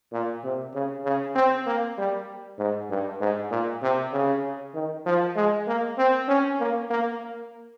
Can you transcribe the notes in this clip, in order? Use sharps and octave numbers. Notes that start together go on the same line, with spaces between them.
A#2
C3
C#3
C#3
C4
A#3
G3
G#2
G2
G#2
A#2
C3
C#3
D#3
F3
G#3
A#3
C4
C#4
A#3
A#3